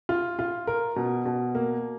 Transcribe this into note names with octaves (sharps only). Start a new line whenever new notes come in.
F4
F4
A#4
B2
B2
A#3